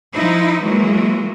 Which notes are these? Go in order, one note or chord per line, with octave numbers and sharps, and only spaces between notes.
F3 D#4 E4
E3 F#3 G#3 A#3